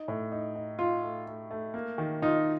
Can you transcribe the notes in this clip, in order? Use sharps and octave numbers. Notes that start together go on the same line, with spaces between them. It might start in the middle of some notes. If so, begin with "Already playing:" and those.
Already playing: D#4
A2
D#4
D#4
D#4 F4
A3
A3
A3
A#3
D#3
D#4 F4